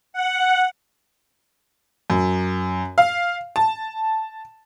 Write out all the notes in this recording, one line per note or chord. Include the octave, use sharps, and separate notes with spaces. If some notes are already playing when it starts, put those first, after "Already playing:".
F#5
F#2
F5
A5